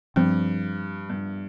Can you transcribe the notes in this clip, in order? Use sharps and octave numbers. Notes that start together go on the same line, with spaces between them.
G2 F3 C4
G2